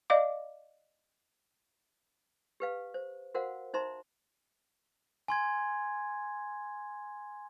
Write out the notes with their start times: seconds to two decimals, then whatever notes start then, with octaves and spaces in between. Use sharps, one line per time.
0.10 D5 D#5 F5 D6
2.60 G4 B4 F5
2.94 C5
3.34 F#4 A#4 C5 F5 F#5
3.74 D#4 C5 E5 A#5 C6
5.28 G#5 C6 G#6